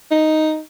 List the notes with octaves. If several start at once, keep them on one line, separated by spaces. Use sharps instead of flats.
D#4